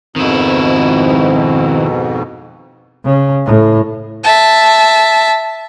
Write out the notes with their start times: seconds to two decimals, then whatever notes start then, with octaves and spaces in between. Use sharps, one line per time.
0.16 F2 G#2 B2 D#3 C4 E4
3.05 C#3
3.46 A2
4.24 E5 A5